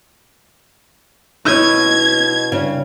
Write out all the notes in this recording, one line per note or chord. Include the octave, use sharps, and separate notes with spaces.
B2 E4 C#5 D#5 G#6
G2 C#3